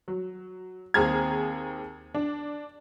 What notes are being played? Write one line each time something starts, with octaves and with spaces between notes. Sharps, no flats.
F#3
D#2 C4 G#4 A#5 F6 G#6
D4